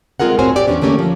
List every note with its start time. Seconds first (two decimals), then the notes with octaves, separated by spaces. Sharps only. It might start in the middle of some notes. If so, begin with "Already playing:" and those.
0.20 G#3 C4 F4 G#4 A#4 F#5
0.39 A2 C4 F#4 C5 C#5 G#5
0.56 G4 D5
0.67 E2 D3 B3 C#4 D4
0.81 D3 A3 A#3 C#4 G4
0.99 F3